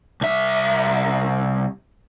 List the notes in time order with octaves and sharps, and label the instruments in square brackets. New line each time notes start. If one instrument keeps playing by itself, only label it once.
[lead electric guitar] C2 E5